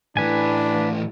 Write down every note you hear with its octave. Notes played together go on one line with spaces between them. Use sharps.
A2 E3 D4 B4 G#5